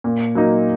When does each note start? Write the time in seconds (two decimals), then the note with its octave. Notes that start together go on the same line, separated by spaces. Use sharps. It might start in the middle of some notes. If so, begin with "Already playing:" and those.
0.04 A#2
0.35 F#3 A#3 D#4